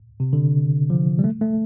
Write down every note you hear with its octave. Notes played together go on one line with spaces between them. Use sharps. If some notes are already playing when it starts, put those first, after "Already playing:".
C3
D3
F3
G3
A3
A3